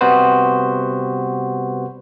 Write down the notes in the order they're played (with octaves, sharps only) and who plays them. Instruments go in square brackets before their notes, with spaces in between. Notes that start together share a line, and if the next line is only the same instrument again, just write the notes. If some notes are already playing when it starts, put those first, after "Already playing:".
[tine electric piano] C3 G3 B3 F#4 B4 C5